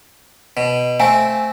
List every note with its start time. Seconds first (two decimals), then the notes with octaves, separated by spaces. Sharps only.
0.57 B2
1.00 A3 C4 F5 G#5